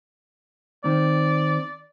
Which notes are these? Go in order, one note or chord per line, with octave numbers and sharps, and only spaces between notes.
D#3 C4 D5